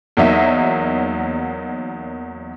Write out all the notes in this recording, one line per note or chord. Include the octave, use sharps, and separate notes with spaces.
E2 F#3 A#3 D#4 E5